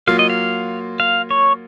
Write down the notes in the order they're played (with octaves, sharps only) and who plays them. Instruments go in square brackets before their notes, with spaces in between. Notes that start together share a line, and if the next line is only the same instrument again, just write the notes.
[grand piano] F#3 A#3 F4 [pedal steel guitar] F5
[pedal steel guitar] D#5
F5
F5
C#5